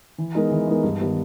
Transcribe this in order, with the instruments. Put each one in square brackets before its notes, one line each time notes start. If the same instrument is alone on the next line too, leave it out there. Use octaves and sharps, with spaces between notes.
[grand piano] E3
G#3 B3 D#4 A#4
E3
G#3 B3 D#4 A#4
G2
D#3 G3 B3